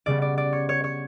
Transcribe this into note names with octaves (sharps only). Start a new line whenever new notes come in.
C#3 G3 B3 D5
D5
D5
C#5
C#5
C#5